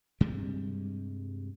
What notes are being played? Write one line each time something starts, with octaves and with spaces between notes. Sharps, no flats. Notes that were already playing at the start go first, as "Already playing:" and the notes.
G2 C3 G3 G#3